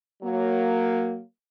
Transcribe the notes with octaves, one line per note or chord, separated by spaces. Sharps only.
F#3 A#3